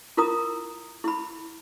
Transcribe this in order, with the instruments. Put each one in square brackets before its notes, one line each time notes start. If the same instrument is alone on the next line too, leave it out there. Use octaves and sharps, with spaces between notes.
[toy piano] E4 F4 A#4 A#5 D#6
E4 B5